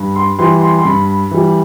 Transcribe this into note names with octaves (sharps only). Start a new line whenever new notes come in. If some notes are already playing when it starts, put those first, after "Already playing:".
Already playing: G2
C6
E3 G3 C6
C6
C6
G2 B5
E3 G3